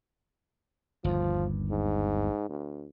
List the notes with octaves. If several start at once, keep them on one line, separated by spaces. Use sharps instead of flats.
G1 D#2 F3
G#2
D2